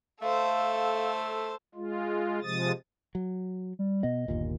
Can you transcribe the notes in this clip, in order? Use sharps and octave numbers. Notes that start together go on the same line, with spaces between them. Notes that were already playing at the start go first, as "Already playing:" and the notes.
A3 A4 C5 F5
G#3 F4
C3 F3 G#3 D#6 A6
F#3
G3
B2 B3 D#5
G1 D#2 A#2